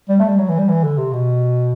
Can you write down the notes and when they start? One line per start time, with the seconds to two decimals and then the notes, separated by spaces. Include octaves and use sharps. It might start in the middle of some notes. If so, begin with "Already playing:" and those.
0.09 G3
0.20 A3
0.28 G3
0.39 F#3
0.48 E3
0.58 G3
0.68 E3
0.84 D3
0.98 C3
1.13 B2